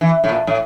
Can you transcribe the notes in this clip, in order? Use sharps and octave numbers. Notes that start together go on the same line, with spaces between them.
E3
A2
A#2
A2